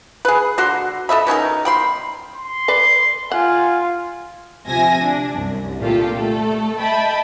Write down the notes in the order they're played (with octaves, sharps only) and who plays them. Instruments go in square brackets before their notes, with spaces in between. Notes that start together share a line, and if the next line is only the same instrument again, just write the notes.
[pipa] G#4 B4
D3 F#4 C6
A4 D#5 E5 B5
B2 C#4 D#4 A#4
G5 B5 C6
[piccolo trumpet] C6
[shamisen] B4 D5
[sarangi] F4 [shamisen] F#5 [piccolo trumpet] G#5
[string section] D2 C3 F3 E5 G#5 A#6
D4
C2 F#2
A#2 D3 A3 F4 G4 A4
A3 A4
D#5 E5 G5 A5 B5